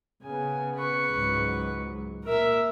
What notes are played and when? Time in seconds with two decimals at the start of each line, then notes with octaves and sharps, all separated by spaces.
0.23 C#3 B3 G#5
0.76 B4 C#6
1.10 C#2 G#2 F#3
2.25 A#2 A#4 E5